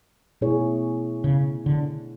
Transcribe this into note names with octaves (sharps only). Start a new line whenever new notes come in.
B2 A3 E4 G#4 C#5
C#3
D3